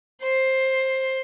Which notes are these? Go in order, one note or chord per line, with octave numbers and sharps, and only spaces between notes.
C5